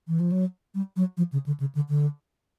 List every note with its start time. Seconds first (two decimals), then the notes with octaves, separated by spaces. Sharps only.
0.08 E3
0.20 F3
0.32 F#3
0.75 G3
0.96 F#3
1.17 F3
1.32 C#3
1.46 D3
1.60 C#3
1.75 D3
1.89 D3